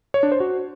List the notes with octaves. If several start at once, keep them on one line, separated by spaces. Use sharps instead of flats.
C#5
D4
C5
F#4